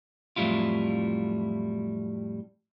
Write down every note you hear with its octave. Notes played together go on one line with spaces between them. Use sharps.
F2 A2 F#3 G3 E4 F4